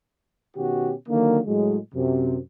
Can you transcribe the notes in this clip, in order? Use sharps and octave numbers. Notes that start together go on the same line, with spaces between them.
B2 D#3 C#4 F#4 G4
D3 D#3 F#3 A#3
A2 F#3 G#3
F#2 C3